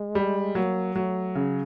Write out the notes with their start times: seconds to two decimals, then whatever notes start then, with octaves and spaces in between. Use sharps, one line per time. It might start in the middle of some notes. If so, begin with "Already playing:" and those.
Already playing: G#3
0.15 G3
0.55 F#3 A#3
0.95 F#3 A3
1.35 C#3